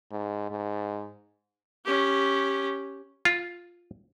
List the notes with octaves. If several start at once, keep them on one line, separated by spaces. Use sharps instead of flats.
G#2
G#2
C#4 G4
F4